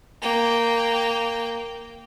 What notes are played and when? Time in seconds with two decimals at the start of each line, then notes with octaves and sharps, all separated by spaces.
0.22 A#3 G5